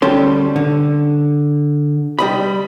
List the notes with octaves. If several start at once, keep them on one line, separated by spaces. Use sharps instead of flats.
D2 G3 C#4 A4 C6
D3
G3 D#5 B5